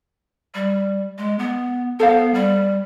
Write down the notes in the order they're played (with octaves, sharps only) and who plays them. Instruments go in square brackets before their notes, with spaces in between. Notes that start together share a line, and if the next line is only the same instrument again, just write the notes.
[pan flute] G3
G#3
B3
[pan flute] B3 [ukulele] A4 C5 F5
[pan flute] G3